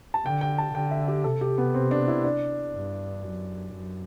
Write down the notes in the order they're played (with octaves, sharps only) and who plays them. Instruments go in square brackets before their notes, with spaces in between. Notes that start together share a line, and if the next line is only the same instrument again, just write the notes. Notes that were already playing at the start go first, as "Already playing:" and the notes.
[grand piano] A5
[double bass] D3 [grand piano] G5
[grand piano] G5
A5
[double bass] D3 [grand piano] G5
[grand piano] E5
G4
[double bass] C3 [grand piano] A4
[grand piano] G4
B3
C4
D4
E4
D4
[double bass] G2
F#2
F#2